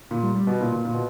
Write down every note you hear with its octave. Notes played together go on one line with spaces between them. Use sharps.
A#2
G3
G3
B2
A#2
A#2
A#2
B2